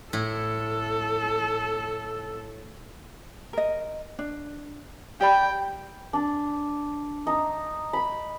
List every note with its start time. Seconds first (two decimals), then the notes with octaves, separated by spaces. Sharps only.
0.13 A2 E4 A4
3.53 A#4 D#5
4.19 D4
5.20 G4 D5 G5 B5
6.13 D4
7.27 D#4
7.93 B5